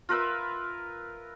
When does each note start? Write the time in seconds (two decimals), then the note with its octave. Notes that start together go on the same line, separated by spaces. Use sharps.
0.09 F4 A#4 B4 E5